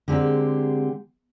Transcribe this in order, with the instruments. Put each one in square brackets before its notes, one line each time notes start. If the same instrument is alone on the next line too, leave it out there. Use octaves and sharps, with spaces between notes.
[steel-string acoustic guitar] D3 G#3 C4 G4 A#4